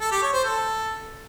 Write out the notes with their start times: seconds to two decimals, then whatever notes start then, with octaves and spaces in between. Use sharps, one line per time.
0.01 A4
0.11 G4
0.22 C#5
0.33 C5
0.44 A4